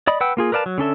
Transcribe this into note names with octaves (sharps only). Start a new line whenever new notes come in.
D5 D#5 B5
B4 F#5 G5 E6
A#3 F4 G#4
A#4 B4 D5 F5 A5
F#3
D3 C#4 A4 E5